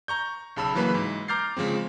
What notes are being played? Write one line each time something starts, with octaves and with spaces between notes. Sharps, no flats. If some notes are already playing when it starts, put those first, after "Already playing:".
A#5 C#6 G6
B1 C#3 A5 B5 E6
C#3 E3 F#3 A#3 B4 B5
G#2 E3
A#5 D6 F6 G6 A6 C7
C#3 F3 G#3 C4